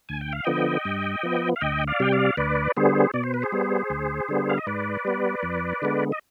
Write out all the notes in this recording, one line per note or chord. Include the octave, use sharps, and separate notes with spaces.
D2 G#5
G5
F5
D3 F3 B3 D#5 G5
G2
F3 B3
F5
D2 D#5 G5
D5 F5
C3 G3 G5
D5 F5
D2 B4 D5
D3 G3 B3 G#4 C5
B2 D5
C5
B4
G#4 C5
G3 B3
D2
D3 G3 B3
F5
D#5
G#2 B4 D5
G3 B3
F2
D3 G#3 B3
D#5